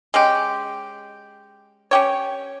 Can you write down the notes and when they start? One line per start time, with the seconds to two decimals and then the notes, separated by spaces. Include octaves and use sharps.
0.14 G#3 C#4 G4
1.91 C#4 G4 C#5